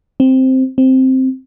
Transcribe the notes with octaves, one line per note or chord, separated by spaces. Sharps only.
C4
C4